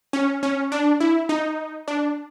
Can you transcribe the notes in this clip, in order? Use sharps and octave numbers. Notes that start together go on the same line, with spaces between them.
C#4
C#4
D4
E4
D#4
D4